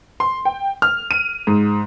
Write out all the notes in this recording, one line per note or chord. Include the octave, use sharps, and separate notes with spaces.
C6
G5
F6
D#7
G#2